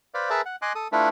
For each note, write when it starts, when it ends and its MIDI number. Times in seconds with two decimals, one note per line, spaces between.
0.14 0.30 71
0.14 0.30 72
0.14 0.30 74
0.14 0.30 77
0.30 0.41 68
0.30 0.41 70
0.30 0.41 71
0.30 0.41 76
0.30 0.41 81
0.45 0.56 78
0.62 0.73 75
0.62 0.73 80
0.62 0.73 84
0.62 0.73 86
0.62 0.73 90
0.75 0.88 69
0.75 0.88 87
0.92 1.09 57
0.92 1.09 62
0.92 1.09 64
0.92 1.09 65
0.92 1.09 69
0.92 1.09 71